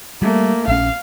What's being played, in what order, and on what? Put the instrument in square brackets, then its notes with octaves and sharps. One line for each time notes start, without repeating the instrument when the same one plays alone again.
[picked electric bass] G3 [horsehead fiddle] A3 A#3
[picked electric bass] A#1 C#4 [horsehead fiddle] F5